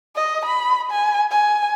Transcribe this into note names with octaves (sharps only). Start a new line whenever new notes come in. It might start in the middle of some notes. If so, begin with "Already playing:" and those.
D#5
B5
G#5
G#5